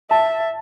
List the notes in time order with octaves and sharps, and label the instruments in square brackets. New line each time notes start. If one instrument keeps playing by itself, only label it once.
[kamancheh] E5 [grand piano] A5